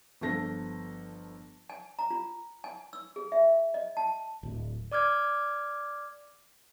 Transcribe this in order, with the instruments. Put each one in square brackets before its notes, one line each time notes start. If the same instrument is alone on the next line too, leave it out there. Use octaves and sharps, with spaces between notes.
[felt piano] G1 F3 A4 A5 A#6
[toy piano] G#5
A#5
F4
G#5
E6
G#4
E5
D#5
A5
[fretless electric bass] D1
[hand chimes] D5 D6 F6 G#6